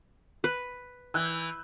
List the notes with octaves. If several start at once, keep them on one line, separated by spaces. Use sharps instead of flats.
B4
E3 E6 F#6 G6